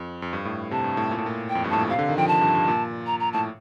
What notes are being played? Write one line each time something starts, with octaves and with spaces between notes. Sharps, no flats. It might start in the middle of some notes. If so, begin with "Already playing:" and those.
Already playing: F2
F2
G2
A2
C3 A5
G2
A2
A#2
A2
A#2
G5
F2
G2
A2 A5
A#2
C3 F5
D3
D#3
F3 G5
A5
G2
G2
A#2
A#5
A#5
A2 A5